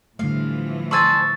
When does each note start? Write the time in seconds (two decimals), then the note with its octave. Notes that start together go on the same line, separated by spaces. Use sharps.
0.19 A2 D3 E3 F3 G3 A3 F5
0.91 D4 C5 G#5 C#6 E6 A6